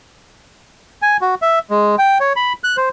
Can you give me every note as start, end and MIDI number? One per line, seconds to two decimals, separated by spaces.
1.02 1.17 80
1.21 1.35 66
1.42 1.59 76
1.70 1.95 56
1.98 2.18 79
2.20 2.33 73
2.36 2.53 83
2.64 2.77 90
2.77 2.89 72